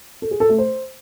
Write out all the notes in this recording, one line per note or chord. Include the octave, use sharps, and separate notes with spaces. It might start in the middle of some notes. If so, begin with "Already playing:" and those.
A4
G#4
A4
A3
C5